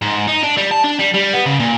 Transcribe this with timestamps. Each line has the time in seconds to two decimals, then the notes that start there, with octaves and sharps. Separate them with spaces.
0.02 G#2
0.28 D#4
0.43 D4
0.57 G3
0.71 A5
0.84 D4
0.99 G3
1.14 G3
1.33 B3
1.46 C#3
1.60 A#2